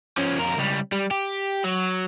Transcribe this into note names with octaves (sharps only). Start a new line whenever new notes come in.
F3 C#4
F2 A#4
C#2 G3
G3
G4
F#3